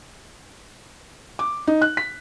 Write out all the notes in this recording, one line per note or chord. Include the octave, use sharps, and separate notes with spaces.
D6
D#4
F#6
B6